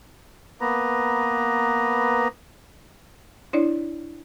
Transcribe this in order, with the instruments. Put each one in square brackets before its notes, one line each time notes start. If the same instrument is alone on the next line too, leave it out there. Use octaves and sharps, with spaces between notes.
[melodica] A#3 B3 B4 A#5
[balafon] D4 E4 C#5 D5